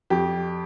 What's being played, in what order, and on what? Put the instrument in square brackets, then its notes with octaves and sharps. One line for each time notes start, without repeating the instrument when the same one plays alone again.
[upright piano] F2 G4